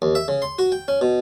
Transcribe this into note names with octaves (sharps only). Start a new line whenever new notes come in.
D#2
E5
C#3
C6
F#4
G5
C#4
B2